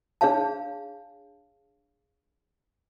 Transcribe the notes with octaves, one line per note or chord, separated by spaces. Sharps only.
D4 G#4 C#5 F5 A5